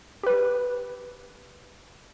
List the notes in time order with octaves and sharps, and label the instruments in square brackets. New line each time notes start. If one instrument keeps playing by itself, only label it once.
[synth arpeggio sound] G4 B4